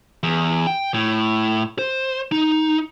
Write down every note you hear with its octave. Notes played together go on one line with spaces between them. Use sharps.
E2
G5
A2
C5
D#4